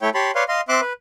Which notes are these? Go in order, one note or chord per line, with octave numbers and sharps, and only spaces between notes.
A3 E4 C#5 G5
G4 C#5 A5 B5 C6
B4 C#5 D5 F5 C6
D#5 F5 C6
C4 E5 C6 D6 F#6
B4